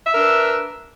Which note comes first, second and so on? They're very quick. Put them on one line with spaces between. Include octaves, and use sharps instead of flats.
E5 A#4 D4 B4